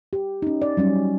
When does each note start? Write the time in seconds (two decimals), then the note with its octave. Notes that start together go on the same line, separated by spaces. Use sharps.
0.13 G4
0.42 C#4 D#4
0.62 D5
0.77 F#3 G3 C#4